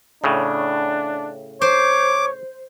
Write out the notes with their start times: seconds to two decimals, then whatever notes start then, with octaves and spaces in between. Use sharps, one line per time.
0.24 A2 C#3 D4
1.62 C5 C#5 D6